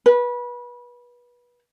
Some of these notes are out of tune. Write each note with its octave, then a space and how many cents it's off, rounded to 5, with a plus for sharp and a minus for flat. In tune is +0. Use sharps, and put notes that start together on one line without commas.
B4 -25